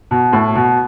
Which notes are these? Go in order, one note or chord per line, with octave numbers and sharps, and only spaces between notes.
B2
A2
B2